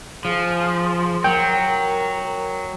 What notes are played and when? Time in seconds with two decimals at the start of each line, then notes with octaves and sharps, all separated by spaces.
0.25 F3 G#4
1.24 F#3 A#4 G5